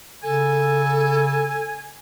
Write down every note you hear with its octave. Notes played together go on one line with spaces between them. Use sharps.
C#3 A4 G#5